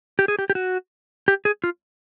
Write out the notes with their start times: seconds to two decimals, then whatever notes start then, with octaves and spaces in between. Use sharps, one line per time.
0.19 G4
0.28 G#4
0.39 G4
0.50 G4
0.55 F#4
1.28 G4
1.45 G#4
1.64 F4